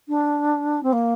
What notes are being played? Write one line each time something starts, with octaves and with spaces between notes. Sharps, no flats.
D4
C4
A#3